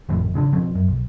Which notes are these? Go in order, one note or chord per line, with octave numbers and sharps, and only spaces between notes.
G#1 F2 A2
A1 C#3 E3 D4
E1 F3 C4 C#4
F#2
B1